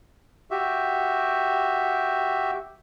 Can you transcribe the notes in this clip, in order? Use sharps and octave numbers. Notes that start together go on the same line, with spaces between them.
F#4 G4 E5